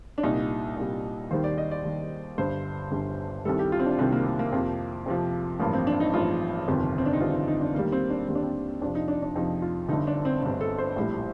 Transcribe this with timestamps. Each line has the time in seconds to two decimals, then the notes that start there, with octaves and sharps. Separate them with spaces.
0.18 D4
0.23 C2 A#2 G3 D#4
0.77 C2 A#2 G3
1.31 D#2 D#3 G3 C5
1.44 D5
1.58 D#5
1.71 D5
1.84 D#2 D#3 G3
2.38 G1 G2 D3 G3 C5
2.91 G1 G2 D3 G3
3.45 C2 C3 D#3 G3 A4
3.59 G4
3.72 F4
3.80 C4
3.86 D4
3.99 C2 C3 D#3 G3 C4
4.12 A#3
4.26 A#3
4.39 A#3
4.53 F2 C3 F3
5.06 F2 C3 F3
5.60 A1 G2 F3 A#3
5.73 C4
5.87 D4
6.00 D#4
6.14 A1 G2 F3 F4
6.67 G1 F2 C3 D#3
6.98 C4
7.06 D4
7.13 D#4
7.20 G1 F2 C3 D#3 F4
7.34 D#4
7.48 D#4
7.61 D4
7.74 D#2 D#3 G3 A#3
7.85 A#3
7.92 C4
8.10 D4
8.28 D#2 D#3 G3 C4
8.35 D4
8.43 C4
8.82 F2 C3 F3 D4
8.95 D#4
9.08 D4
9.22 D4
9.36 F2 C3 F3 D#4
9.62 F4
9.89 G1 G2 D3 D#4
10.07 D4
10.25 C4
10.42 G1 G2 D3 C4
10.61 A4
10.78 C5
10.96 A#1 A2 G3